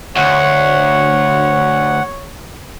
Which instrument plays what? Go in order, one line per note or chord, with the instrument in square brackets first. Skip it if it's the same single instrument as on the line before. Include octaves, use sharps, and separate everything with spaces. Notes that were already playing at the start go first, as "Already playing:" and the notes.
[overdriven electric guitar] D2 [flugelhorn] C#5 [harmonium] F#5